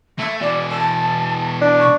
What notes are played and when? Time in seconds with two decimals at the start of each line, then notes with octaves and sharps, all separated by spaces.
0.19 A3 E5
0.41 B2 E3 D5
0.69 A5
1.61 D4
1.80 C#6